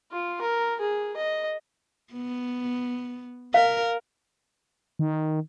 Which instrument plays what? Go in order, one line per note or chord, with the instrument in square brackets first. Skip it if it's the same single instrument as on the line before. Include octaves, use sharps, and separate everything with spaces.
[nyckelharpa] F4
A#4
G#4
D#5
[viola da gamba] B3
[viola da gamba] A#4 [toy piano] F5
[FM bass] D#3